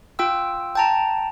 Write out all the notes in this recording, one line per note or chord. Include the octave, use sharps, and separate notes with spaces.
F4 G5 E6
G5 A5 A#5